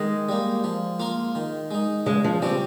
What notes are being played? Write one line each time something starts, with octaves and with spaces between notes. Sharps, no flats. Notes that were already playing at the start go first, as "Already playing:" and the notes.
Already playing: D#3 G#3
G3 A#3
F3
A#3 F4 A#4
D#3
G#3 D#4
C#3 G#3
F3
G3 C4 C#4 G4